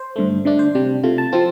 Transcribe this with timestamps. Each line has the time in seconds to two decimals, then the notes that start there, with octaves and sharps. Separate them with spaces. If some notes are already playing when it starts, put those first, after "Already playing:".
Already playing: C5
0.16 G2 D3 A3
0.45 D3 A3 D4
0.59 C5
0.75 C3 G3 D4
1.03 C3 A3 F4
1.18 A5
1.32 F3 C4 F4